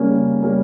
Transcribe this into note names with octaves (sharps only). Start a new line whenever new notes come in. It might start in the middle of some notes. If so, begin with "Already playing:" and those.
Already playing: C#3 G3 A#3 C#4
C#3
G3 A#3 C#4